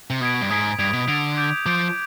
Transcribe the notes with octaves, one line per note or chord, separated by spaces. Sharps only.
C3
B2 D#6 G#6 B6 D7
G2
G#2 D#6 G#6 B6 D7
G2 G#6 D7 F7
B2
D3 G#6 D7 F7
D6 G6 D7
F3 D6 G6 D7